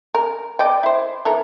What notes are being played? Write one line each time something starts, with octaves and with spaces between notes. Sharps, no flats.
A#4
D5 D#5 G5
E4 C5
E3 A4 A#4